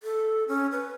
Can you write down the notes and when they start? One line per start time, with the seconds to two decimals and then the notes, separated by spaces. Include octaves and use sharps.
0.03 A4
0.48 C#4
0.72 B4